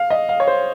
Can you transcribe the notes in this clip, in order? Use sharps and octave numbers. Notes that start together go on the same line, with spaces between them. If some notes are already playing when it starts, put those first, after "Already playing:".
Already playing: F5
D#5
F5
C#5
C5